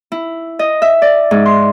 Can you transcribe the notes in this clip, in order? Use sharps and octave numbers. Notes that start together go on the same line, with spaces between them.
E4
D#5
E5
D5
G#2
C6